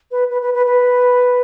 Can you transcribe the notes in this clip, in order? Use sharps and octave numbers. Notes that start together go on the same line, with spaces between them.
B4
B4
B4
B4
B4